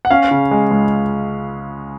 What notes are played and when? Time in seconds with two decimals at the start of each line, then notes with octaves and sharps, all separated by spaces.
0.05 F#5
0.11 C#4 F5
0.31 C#3
0.51 G#3
0.71 C#2